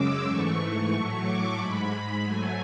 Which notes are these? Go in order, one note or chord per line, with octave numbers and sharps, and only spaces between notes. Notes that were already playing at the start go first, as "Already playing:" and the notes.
Already playing: F#2 C#3 G#3 D6 E6
G#2 E3 A3 C#6
A2 F#3 A3
D6
G#2 G#3 B5
G#2 F#3 A3 G#5